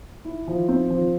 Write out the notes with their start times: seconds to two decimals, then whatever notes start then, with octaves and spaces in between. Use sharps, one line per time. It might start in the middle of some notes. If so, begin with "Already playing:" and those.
0.25 E4
0.48 F3
0.68 C4
0.90 F3